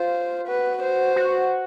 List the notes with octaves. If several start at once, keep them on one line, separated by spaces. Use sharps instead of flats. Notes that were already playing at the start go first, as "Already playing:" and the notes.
Already playing: F4 C5
F#4 B4
C5
F#4